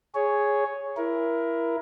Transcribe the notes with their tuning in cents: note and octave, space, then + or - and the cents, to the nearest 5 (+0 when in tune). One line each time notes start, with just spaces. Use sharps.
G#4 +0 C#5 +0
E4 +20 A#4 +25